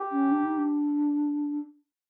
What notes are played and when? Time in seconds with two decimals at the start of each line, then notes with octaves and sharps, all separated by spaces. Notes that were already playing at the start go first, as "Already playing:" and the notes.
Already playing: G4
0.11 C#4
0.31 D4
0.44 D#4
0.57 D4